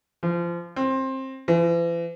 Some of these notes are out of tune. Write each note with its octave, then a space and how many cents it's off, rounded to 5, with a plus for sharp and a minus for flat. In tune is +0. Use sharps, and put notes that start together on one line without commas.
F3 -25
C4 +20
E3 +45